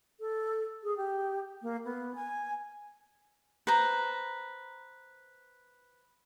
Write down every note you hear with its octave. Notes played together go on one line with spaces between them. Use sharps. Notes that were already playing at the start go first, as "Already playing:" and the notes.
A4
G#4
G4
A#3
B3
G#5
B4 C5 A#5